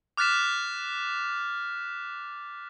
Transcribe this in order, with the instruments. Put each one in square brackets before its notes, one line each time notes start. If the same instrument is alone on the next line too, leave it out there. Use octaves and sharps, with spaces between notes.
[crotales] D6 F6 F#6 A6 B6 E7